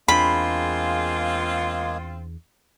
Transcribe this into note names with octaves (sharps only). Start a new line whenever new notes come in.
E2 G#3 A#3 C4 D4 F4 G#4 B5